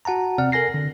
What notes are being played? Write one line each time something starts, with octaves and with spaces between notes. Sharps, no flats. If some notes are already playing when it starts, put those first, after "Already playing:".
F#4 F#5 A5 A#5
C3 C4 D5 F#5 F6
A4 A#4 G#5 A#6 C7
D3